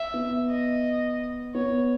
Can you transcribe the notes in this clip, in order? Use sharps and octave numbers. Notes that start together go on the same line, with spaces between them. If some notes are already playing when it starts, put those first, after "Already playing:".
Already playing: E5
B3
D#5
B3 C#5